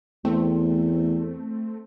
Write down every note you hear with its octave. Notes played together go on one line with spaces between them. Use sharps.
E2 A3 C4